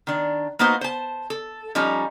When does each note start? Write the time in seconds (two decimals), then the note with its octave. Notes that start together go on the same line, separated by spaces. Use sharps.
0.07 D#3 D4
0.59 A#3 B3 D#4 F#4 C5
0.81 C5 A5
1.30 A4
1.75 F3 G3 C#4 D#4